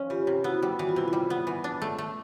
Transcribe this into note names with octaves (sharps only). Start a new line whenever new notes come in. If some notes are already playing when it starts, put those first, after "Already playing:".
Already playing: F3 C#4
E3 F4 G4
C3
B3 E4 F#4
G3
E3 F#4
F4
C3 E4
G3 F4
B3
E3
D4
A3
A3